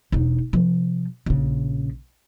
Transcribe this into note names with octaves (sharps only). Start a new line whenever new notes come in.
E1 D#4
C3 F3
A#1 C#3